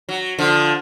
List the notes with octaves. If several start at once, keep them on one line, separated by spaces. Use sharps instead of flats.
F#3
D3 F3